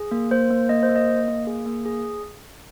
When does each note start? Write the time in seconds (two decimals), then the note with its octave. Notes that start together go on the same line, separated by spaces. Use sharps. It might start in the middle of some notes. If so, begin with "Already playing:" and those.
Already playing: G#4
0.11 A#3
0.31 A#3 C5
0.51 A#3
0.69 A#3 D#5
0.83 C5
0.89 A#3
0.96 D#5
1.08 A#3
1.28 A#3
1.47 G#4
1.66 A#3
1.85 G#4